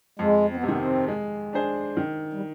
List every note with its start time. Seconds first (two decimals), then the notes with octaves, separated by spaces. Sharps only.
0.19 F2 G#3
0.49 C4
0.57 B3
0.63 C3 G#3
0.68 D#3 B3
0.79 C4
1.08 G#3
1.53 D4 G#4 C5
1.97 D#3
2.33 G3